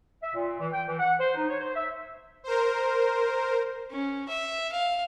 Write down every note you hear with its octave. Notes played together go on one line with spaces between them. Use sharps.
E5
A#2
E3
G5
E3
F#5
C5
D#4
C#5
C5
E5
A#4 C5
C#4
E5
F5